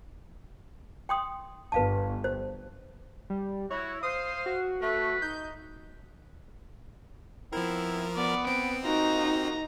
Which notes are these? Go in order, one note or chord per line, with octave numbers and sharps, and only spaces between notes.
G5 C6 D#6
G1 B4 F5 A5
C5
G3
E4 F#4 C#5
C5 F5 D#6
F#4
A3 B4
D#4 G6
F3 B3 C4 E4 A#4
B3 D5
C4 D7
A#3 D#4 F4 F#4 A#5